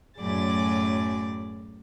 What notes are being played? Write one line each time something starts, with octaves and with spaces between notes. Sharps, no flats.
F#2 A2 F#3 G#4 D5 A6